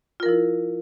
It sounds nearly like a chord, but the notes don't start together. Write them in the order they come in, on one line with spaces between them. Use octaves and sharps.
F4 A#4 F3 E4